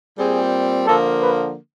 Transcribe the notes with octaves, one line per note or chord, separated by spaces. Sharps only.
A#2 G3 C4 G#4
D3 F3 A#3 A4
B4